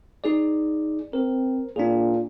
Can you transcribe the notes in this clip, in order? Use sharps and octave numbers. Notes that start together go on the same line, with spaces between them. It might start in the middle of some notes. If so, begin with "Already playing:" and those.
D#4 G#4 D5
C4 A#4
A#2 D4 G#4